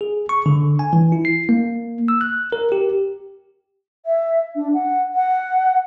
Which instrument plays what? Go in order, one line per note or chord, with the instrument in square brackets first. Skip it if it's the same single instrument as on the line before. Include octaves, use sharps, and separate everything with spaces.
[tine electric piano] G#4
C#6
D3
G#5
E3
E4
C7
A#3
E6
F#6
A#4
G4
[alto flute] E5
D4
F#5
F#5